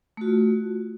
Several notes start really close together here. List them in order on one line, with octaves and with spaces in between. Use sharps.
A3 F#4 F4